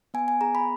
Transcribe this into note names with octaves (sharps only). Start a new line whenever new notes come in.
B3 G#5
G#5
G#4 A#5
B5